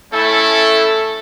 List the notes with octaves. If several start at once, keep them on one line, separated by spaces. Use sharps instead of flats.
A3 C#4 E4 A4